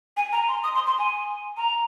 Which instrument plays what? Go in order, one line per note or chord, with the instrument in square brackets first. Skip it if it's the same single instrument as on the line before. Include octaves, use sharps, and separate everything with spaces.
[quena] G#5
A#5
C6
D#6
C6
C6
G#5
A#5